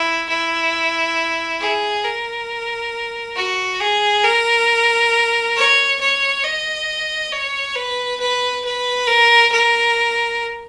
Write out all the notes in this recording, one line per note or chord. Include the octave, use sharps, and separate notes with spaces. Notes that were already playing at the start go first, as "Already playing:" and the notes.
Already playing: E4
E4
G#4
A#4
F#4
G#4
A#4
C#5
C#5
D#5
C#5
B4
B4
B4
A#4
A#4